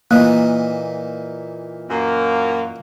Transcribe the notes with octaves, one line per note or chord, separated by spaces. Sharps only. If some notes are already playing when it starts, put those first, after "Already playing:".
A#2 E3 A#3 D#4
F#2 A#3